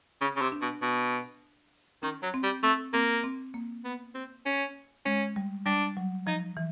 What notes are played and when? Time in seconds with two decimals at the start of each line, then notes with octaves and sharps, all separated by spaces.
0.21 C#3
0.36 C#3
0.42 C3
0.52 D4
0.62 B2
0.82 B2
2.03 D#3 C#4
2.23 F#3
2.34 C4
2.44 G3
2.63 A3 C4
2.93 A#3 C4
3.24 C4
3.54 A#3
3.85 B3
4.15 C4
4.46 C#4
5.06 G#3 C#4
5.36 G3
5.66 G3 D4
5.97 F#3
6.27 F3 D#4
6.57 E3